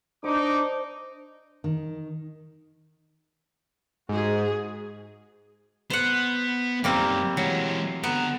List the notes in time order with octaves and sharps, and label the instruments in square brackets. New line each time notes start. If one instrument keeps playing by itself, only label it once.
[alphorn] D4 [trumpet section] D#4 D6 [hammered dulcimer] C5
[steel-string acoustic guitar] D#3
[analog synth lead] G#2 [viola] F#4 G#4
[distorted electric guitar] B3 [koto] C5 F#5
[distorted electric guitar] F#2 D#3 [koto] G3 A#3 C4
[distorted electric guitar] E3 G#3 [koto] F#3
[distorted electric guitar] D3 A#5 [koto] B3